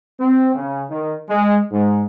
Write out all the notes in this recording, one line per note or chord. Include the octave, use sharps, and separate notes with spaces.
C4
C#3
D#3
G#3
G#2